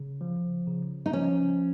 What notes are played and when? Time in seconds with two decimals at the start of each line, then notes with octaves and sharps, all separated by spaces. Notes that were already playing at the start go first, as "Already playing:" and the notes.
Already playing: C#3
0.21 F3
0.67 C#3
1.06 D#4
1.13 F3 C#4